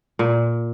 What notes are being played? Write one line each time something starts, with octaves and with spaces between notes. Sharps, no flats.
A#2